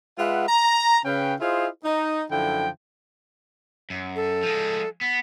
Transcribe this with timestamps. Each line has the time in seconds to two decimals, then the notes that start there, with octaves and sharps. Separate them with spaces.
0.18 G#3 F4 B4 E5 F#5
0.48 A#5
1.04 C#3 C#4 B4 F5 G5
1.41 E4 F4 G#4 C5 D#5 F5
1.84 D#4
2.31 F#2 D3 F3 E4 G5
3.90 F#2
4.16 A4
4.43 F3 G#3
5.01 B3